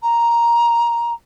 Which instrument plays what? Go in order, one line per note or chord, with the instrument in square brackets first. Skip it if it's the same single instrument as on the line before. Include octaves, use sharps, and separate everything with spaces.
[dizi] A#5